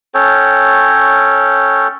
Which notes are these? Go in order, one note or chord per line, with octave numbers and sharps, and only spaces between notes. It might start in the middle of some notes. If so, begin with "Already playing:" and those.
C#4 A4 C#5 G5